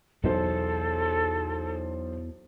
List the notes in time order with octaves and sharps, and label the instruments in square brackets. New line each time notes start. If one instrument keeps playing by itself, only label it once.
[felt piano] B1 C5 [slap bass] E2 [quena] A4